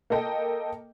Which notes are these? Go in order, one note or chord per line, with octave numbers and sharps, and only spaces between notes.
A#3 A4 D#5 G5